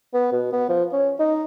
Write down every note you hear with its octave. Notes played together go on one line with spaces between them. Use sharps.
B3
B2
B3
F3
C#4
D#4